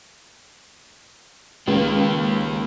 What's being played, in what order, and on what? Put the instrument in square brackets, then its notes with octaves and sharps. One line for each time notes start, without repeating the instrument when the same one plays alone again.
[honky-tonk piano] C#2 [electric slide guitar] D#3 A#3